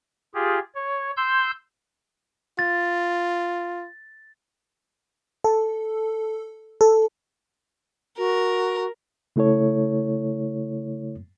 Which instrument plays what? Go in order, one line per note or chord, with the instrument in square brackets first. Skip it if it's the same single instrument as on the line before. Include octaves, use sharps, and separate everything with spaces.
[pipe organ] F4 G4 G#4
C#5
C6 E6 G6
[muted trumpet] F4 [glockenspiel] A6
[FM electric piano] A4
A4
[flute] F#4 [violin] A#4
[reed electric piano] C#3 A3 E4 A4 C#5